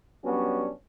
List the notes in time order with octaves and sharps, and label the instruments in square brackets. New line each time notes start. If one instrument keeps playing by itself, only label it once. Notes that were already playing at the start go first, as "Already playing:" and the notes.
[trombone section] F#3 G3 B3 C#4 D4 F#4